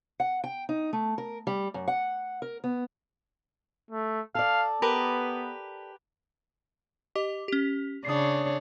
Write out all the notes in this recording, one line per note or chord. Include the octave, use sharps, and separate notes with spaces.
F#5
G5
D#4
A3
A#4
G3
F#2
F#5
A#4
B3
A3
A4 D5 F5
B3 G4 A#4 B4
G4 D#5 D6
C#4 G4
C#3 D4 C#5 D#6 C7